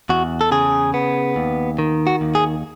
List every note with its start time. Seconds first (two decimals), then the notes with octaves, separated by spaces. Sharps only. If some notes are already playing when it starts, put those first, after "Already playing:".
0.09 E2 F#4
0.41 A4
0.52 C#3 G#4
0.94 B3
1.36 D#2
1.79 D#3
2.07 F#4
2.21 D#2
2.35 G#4